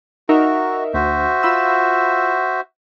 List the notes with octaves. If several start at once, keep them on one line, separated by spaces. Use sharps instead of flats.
D#4 F#4 A#4 E5
D2 F#4 C5 E5
F4 B5 E6